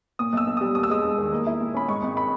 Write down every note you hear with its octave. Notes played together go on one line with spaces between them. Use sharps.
A#2 D#6
B1 E6
B1
D#6
G3
D#2 D#6
E6
G#3 D#6
E1
D#3
A#3
E4
A#2
C#4 B5
G#2 C#6
G#1
B5